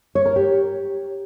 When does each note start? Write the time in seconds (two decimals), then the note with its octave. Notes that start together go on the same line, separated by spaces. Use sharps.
0.15 C#5
0.26 A#4
0.36 G4